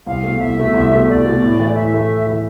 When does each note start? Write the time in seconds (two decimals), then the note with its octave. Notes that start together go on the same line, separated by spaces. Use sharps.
0.06 C2 F5
0.23 B2 A3
0.40 C2 E5
0.57 B2 A3
0.74 C2
0.91 B2 A3
1.09 C2 D5
1.25 B2 A3
1.42 A2
1.59 E3 A3 E4
1.75 A2 E5
1.93 E3 A3 E4
2.09 A2
2.26 E3 A3 E4